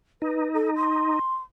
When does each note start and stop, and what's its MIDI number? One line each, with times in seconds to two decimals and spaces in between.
0.22 1.19 63
0.22 0.49 71
0.54 0.69 69
0.76 1.36 84